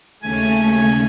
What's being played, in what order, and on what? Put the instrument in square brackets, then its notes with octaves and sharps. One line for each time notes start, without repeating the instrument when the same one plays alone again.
[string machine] D#2 C#3 C#4 [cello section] A3 [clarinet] G#5